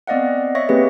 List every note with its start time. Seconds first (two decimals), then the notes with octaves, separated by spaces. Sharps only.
0.07 B3 C4 D5 D#5 F5 F#5
0.55 C#5 D#5 E5 C#6 A#6
0.69 A#3 C4 G4 G#4 B4